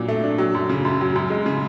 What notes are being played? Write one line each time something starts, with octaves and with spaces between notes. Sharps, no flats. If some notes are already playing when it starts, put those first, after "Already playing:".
Already playing: A#2 F#3 D4
A3
D4
F#3
F#2
C#3
F#2
F#3
F#2
G#3
C#3